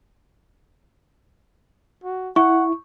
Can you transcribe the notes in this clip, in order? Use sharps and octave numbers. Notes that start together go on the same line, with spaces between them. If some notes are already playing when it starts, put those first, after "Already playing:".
F#4
E4 F#5 C#6